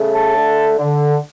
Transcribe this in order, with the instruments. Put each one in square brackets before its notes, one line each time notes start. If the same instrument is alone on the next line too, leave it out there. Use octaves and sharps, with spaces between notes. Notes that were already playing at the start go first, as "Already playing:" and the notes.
Already playing: [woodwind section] C#3 A3
A5
D3
D3